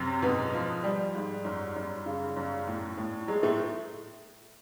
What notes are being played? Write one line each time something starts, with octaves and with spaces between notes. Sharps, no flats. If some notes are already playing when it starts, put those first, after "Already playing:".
Already playing: F#2 C3 C4
G#2 B2 B3
F3
F3 G3
G#2
F#2
F#2
C#3
F#2
A2
A2
F#3 G#3
A2 A3